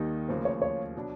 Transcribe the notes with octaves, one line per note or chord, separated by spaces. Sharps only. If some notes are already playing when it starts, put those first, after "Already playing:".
Already playing: D#2 D#3 G3 A#3 D#4
D2 C#3 F3 A#3 C5
C#5
C#5
B2 F#3 B3 D4